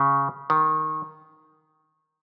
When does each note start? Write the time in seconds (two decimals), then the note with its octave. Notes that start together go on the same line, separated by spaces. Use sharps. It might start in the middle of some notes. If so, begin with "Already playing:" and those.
Already playing: C#3
0.50 D#3